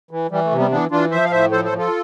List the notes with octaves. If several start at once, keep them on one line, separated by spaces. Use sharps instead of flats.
E3
E3 G3
A3
C3
G3 B3
E3 B3 D4
E3 D4 F4
F3 C5 E5
F5
A2 C5 E5
F3 A4 C5
A4 C5
F3
F4 A4